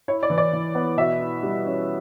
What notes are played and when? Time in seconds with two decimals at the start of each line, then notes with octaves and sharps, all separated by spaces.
0.08 E4 C#5
0.23 D5
0.30 E3
0.38 D5
0.53 E3
0.75 B3
0.97 B2 E5
1.20 E4
1.43 G3
1.66 C#4